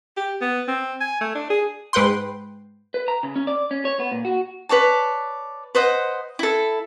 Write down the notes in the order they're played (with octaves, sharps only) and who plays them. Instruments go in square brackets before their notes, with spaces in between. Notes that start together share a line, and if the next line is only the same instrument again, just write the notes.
[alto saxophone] G4
B3
C4
G#5
A3
D4
G#4
[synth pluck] G#2 B4 F#5 G5 C6
[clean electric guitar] B4
A#5
C#3
C#4
D5
C#4
C#5
B3
A#2
F#4
[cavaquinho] B4 C#5 D5 A5
B4 C5 D#5 F#5
E4 A4